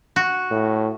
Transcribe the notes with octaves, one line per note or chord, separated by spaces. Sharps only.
F#4
A2